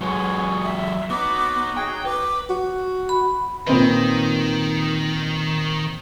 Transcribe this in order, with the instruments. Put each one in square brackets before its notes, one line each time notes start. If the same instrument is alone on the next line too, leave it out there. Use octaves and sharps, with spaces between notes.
[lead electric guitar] F#3 G#3 [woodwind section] B3 G#4 C#6 [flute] C#5
[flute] E5
[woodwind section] F#3 D#4 F#4 [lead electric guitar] B3 [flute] D6
[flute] G#4 [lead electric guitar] G5
[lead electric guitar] B4 [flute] D6
[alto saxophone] F#4
[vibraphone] B5
[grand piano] A#2 C4 B4 [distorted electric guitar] D#3